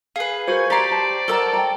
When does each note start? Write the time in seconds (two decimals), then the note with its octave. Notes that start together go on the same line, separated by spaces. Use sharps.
0.16 G#4 B4 F5
0.48 F#4 A#4 C5 G#5 C#6 G6
0.70 G4 A4 D5 A#5 C6
0.91 A5
1.28 A4 A#4 F#5 A#5 E6
1.53 G5 A#5